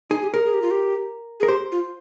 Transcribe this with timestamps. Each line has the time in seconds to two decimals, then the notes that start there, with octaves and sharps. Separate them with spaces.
0.10 D#4 G#4
0.22 G4
0.34 G#4 A#4
0.45 G#4
0.54 G4
0.62 F4
0.71 G4
1.40 G#4 A#4
1.48 G4 C5
1.72 F4